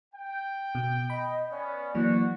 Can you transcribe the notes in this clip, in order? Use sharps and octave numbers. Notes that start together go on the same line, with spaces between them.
G5
B2
D#5 B5
B3 C#4 D5
E3 F#3 A#3 D4 F#4